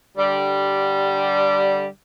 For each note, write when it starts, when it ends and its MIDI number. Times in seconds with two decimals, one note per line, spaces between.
0.17 1.86 50
0.17 1.86 55